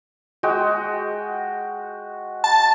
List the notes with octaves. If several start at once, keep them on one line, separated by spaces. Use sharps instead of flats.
G#3 F#4 G5
A5